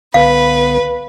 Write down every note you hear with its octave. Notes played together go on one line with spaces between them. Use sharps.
C2 D3 B3 B4 F5